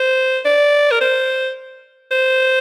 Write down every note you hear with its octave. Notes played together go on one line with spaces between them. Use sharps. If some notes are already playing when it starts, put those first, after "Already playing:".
Already playing: C5
D5
A#4
C5
C5